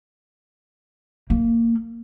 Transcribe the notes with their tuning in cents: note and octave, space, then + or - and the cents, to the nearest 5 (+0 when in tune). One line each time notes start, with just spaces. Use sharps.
A#3 -15